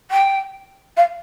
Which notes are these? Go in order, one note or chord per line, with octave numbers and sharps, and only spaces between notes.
G5
F5